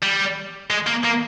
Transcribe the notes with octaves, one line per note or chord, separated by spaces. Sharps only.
G3
G#3
A#3
A#3